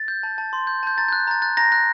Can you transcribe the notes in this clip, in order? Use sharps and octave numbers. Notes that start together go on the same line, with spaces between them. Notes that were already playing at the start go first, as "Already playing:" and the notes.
Already playing: A6
G6
A5
A5
C6
G6
A5 G6
A#5 A6
G6
F#6
G6
A#5 A6
F#6 A6
A#5 A#6
F#6 A#6